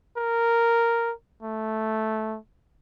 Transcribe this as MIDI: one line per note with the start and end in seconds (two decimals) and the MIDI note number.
0.18 1.13 70
1.43 2.38 57